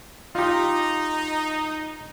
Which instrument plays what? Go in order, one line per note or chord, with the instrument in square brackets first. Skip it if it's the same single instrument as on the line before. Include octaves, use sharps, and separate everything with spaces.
[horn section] D#4 [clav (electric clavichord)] F4 G4